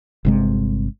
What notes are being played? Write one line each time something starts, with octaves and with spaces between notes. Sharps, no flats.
G1 C3 G#3